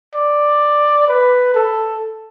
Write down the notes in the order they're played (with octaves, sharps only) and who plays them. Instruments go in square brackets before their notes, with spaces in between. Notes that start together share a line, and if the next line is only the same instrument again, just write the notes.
[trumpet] D5
B4
A4